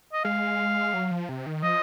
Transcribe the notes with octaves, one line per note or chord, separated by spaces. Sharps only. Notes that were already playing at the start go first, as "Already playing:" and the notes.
D#5
G#3 F5
F#3
F3
C3
D#3
F3 D#5